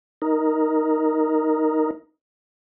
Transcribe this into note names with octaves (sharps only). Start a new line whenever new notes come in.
D#4 A#4